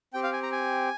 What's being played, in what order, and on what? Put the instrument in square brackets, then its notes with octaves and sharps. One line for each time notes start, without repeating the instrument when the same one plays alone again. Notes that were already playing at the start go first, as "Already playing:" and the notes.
[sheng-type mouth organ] C4 G4 G5
F5
G#5
A#5
G#5